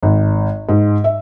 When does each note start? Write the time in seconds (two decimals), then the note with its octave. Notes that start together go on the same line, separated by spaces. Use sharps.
0.03 G#1
0.69 G#2
1.04 E5